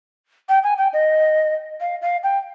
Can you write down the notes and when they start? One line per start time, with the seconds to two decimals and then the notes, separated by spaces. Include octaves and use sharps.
0.49 G5
0.64 G#5
0.78 G5
0.93 D#5
1.80 F5
2.02 F5
2.23 G5